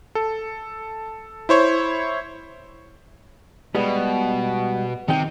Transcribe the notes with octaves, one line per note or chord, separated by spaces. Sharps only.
A4
E4 C5 C#5
B2 G3 G#3 B3
C3 D#3 G5